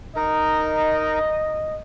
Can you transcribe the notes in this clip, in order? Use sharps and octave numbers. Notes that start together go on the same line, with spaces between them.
D#4 A#4 D#5